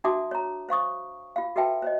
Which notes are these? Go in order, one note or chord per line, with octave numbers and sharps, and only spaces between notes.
D4 F#4 E5 A5 D6 D#6
C#5 A#5
C5 F5 C#6 D#6
F4 F5
F#4 A4 B4 E5 G5 A5
C5 C#5 D#5